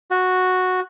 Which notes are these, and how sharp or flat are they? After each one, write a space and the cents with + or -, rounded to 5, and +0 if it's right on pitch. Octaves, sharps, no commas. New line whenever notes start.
F#4 -5